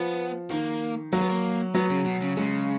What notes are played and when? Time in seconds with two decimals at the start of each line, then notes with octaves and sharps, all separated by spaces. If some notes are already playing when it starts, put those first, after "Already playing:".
Already playing: F3 B3
0.50 D#3 A#3
1.13 F#3 A#3
1.21 B3
1.29 A#3
1.74 F#3 B3
1.90 C#3
2.05 B2
2.22 C#3
2.37 C#3 G#3